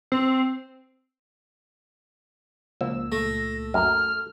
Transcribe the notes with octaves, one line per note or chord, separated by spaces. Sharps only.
C4
C#2 A#2 F3 E6
A3 A#6
F#2 A#4 F6